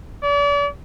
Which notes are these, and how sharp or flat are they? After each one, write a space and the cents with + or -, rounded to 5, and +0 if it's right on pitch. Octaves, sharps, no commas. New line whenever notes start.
D5 -40